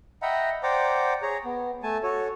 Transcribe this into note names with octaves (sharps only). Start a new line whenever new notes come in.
D#5 E5 F#5 G5 A#5 B5
C5 D5 F#5 G5 A#5 D6
G#4 C#5 A#5
B3
A3 G#5 A5
F#4 A4 C#5